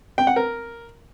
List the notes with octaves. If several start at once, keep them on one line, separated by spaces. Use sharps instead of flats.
G5
F#5
A#4